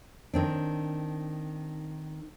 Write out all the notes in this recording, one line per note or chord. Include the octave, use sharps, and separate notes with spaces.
D#3 C4 D4